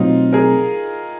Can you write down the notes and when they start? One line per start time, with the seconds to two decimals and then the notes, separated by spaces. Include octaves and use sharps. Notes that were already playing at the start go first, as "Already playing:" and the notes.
Already playing: B2 F#3 A3 C4 D#4 F4
0.33 G#4 A#4